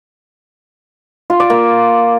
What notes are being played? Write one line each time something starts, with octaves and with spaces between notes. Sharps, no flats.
F4
D5
A#3